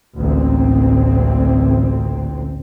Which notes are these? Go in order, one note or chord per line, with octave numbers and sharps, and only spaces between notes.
A1 D2 A#2 C4